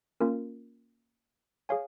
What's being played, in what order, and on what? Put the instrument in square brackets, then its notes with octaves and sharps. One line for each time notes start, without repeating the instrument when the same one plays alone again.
[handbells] A#3 C#4 F4 A#4
G#4 C#5 F5 G#5